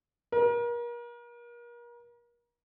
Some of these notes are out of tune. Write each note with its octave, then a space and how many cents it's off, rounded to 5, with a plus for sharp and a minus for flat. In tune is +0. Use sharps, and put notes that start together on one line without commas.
A#4 +35